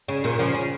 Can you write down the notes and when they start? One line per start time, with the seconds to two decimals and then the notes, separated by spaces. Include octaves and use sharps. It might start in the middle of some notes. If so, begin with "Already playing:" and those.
0.08 C#3
0.24 A#2 D#3
0.39 C#3 F3
0.54 C#3